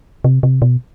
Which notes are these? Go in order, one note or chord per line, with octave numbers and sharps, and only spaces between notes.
C3
C3
B2